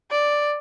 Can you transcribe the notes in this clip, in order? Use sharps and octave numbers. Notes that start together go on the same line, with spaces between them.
D5